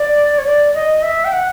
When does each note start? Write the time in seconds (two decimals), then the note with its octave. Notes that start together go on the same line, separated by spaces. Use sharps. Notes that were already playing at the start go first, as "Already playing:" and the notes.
Already playing: D5
0.38 C#5
0.45 D5
0.74 D#5
1.03 E5
1.25 G5
1.32 F#5